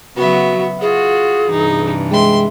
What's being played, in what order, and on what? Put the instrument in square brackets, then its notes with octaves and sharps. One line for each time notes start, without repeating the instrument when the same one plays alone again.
[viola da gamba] C#3 F#3 [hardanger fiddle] B3 E5 [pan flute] F#4
[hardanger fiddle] F4 [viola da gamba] F#4 [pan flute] G#4
[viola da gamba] G2 C3 E3 [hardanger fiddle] D#4
[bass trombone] G#3 [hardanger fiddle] E5 C6 [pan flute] G5